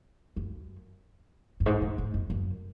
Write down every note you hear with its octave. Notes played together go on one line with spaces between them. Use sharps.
F#2
F#2
G#2
A#2
G#2
F#2
F#2